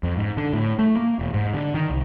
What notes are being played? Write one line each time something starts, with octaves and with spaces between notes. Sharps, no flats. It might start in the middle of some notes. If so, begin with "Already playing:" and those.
F2
G#2
D3
A2
A3
A#3
E1
G#2
D3
D#3
C2